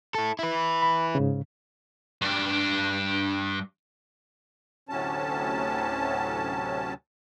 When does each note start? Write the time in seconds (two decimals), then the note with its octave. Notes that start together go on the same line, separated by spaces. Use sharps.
0.15 E4 A4
0.39 E4 B4
0.82 B5
1.15 G#2 C#3
2.22 G2 D4
4.89 D2 A2 C3 F#3 C#4 A5